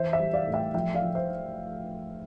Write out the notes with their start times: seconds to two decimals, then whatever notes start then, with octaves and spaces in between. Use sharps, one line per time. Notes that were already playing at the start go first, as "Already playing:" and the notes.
Already playing: E3 C5 E5
0.13 C5 E5
0.19 G3
0.33 D5 F5
0.47 A2
0.53 E5 G5
0.74 F3 E5 G5
0.94 D5 F5
1.02 F3
1.15 C5 E5